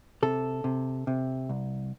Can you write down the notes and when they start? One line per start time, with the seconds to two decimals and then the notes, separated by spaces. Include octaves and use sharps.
0.22 C3 A4
0.64 C3
1.07 C3
1.49 C2